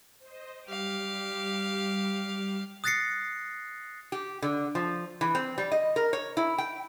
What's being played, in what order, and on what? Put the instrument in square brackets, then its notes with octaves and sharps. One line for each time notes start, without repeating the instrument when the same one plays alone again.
[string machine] C5 D#5
[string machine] G3 [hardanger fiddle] G4 F5
[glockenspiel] D#6 F#6 A6 A#6 C7 C#7
[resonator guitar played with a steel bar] G4
D3
F3
E3
C4
G3
D#5
A#4
C#5
E4
G5